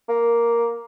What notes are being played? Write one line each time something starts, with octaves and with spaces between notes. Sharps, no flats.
A#3